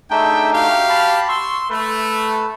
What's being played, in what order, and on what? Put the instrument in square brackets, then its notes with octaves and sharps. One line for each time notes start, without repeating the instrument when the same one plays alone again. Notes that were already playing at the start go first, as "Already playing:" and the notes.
[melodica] A3 D4 D#4 [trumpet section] G#4 E5 G5
[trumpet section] F#4 G4 F5
[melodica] A5 B5
[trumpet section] C6 [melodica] C#6 E6
[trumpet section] A3 [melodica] B4